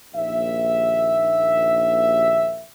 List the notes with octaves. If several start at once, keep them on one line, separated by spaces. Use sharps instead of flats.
A#1 D#2 E5